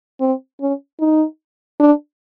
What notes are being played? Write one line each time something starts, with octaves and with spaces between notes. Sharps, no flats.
C4
C#4
D#4
D4